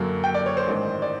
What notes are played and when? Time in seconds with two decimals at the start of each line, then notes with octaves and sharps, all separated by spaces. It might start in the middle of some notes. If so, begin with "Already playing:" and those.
Already playing: F#2 D3 F#3 A#3
0.24 G5
0.34 D5
0.46 C#5
0.57 C5
0.68 A1 G#2 D#3
1.02 D5